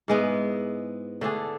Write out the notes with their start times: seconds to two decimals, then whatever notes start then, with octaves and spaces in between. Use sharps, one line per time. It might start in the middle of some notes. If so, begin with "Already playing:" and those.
0.08 G#2 G#3 B3 E4
1.21 D3 A3 D4 G#4